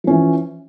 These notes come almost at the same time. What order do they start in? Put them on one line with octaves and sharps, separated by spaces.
F3 C#4 E3